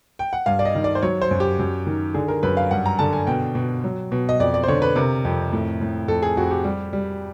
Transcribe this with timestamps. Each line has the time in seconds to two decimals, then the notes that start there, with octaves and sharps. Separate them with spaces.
0.19 G5
0.33 F#5
0.46 G2 F5
0.59 D5
0.65 D#5
0.75 D#3
0.84 D5
0.95 C5
1.03 F#3 C#5
1.22 C5
1.31 F#2
1.40 G4
1.59 F#2
1.86 D#3
2.14 D3 G#4
2.28 A#4
2.43 F#2 B4
2.57 F5
2.71 G2 F#5
2.86 A#5
2.99 D3 A5
3.13 G#5
3.27 B2 G5
3.55 B2
3.84 F#3
4.12 B2
4.29 D#5
4.40 F2 D5
4.54 D5
4.64 C5
4.68 D3 C#5
4.82 B4
4.96 C3 A#4
5.25 F2
5.53 A2
5.81 A2
6.08 F2 A4
6.22 G#4
6.37 F2 F#4
6.51 G4
6.64 G3
6.93 G3